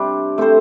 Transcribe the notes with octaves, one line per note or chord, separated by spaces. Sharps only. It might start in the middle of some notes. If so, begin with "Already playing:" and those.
Already playing: C3 G3 D4
A3 C4 A4 C5